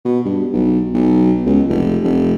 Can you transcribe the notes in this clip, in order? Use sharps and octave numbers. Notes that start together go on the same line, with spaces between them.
B2
G2
B1
B1
C#2
F1
F1